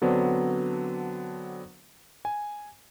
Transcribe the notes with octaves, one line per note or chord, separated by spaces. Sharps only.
D3 F#3 B3 C4 D4 C5
G#5